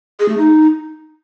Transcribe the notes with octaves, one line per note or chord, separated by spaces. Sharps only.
G#4
A3
D#4